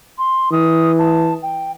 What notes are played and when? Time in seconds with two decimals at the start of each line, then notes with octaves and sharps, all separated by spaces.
0.18 C6
0.51 E3 D#6
0.98 A5
1.42 G5